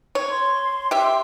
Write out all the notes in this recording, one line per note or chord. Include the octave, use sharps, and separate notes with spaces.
C#5
C6
G4 E5